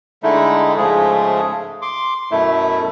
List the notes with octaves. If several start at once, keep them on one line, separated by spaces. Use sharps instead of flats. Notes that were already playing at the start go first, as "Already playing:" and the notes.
D3 G#3 A3 D#4 E4
G#2 C#3 F3 G#3 A3 G#4
C6 D6
F#2 B2 A3 E4